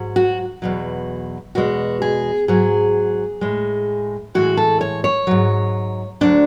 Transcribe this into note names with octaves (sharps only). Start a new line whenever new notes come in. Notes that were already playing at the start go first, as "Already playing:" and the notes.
Already playing: G#2 F#3
F#4
E2 B2 F#3
E2 B2 G#3 F#4
G#4
G#2 F#3 G#4
A2 G#3
A2 E3 G#3 F#4
A4
C#5
C#5
G#2 F#3
D2 D3 F#3 D4